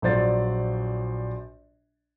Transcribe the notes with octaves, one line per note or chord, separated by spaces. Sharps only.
A#1 F#3 F4 C5 D5 A6